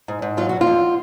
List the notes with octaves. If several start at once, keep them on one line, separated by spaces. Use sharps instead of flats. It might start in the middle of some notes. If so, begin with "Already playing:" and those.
G#2
G#2
F#3 F4
F2 F#4
F4
F2